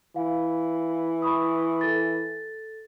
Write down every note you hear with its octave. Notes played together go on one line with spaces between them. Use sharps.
E3 F5
B5 C#6 D#6
A4 A6